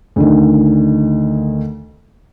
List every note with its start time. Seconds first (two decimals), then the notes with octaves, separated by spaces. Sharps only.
0.16 D2 D3 D#3